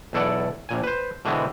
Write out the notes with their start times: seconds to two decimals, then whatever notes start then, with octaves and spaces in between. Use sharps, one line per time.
0.13 B1 E2 E4 A4 D5 F#5
0.69 A#1 A#2 G#5
0.84 B4 C5
1.25 B2 D3 E3 G#3 B3 C4